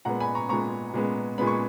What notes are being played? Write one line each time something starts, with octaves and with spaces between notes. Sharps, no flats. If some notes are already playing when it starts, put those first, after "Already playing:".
A#2 G#3 B3 F#5 A#5
G#5 B5
A#5 C#6
A#2 G#3 B3 A#5 C#6
A#2 G#3 B3
A#2 G#3 B3 B5
C#6